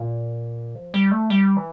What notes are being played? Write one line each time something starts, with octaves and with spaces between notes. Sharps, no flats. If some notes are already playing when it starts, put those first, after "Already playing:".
Already playing: A#2
F3
G3
A3
G3
E3